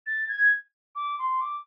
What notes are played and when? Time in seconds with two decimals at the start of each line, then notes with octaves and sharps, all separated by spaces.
0.06 A6
0.28 G#6
0.95 D6
1.19 C6
1.41 D6